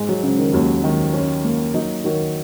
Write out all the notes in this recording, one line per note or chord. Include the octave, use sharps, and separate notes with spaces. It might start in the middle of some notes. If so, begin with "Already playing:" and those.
Already playing: G#2 G#3 D#4
F#3
G#2 C#3
D#3
D#2 F#3
D#3
C#4
A#3
F#3 D#4
D#3 F#3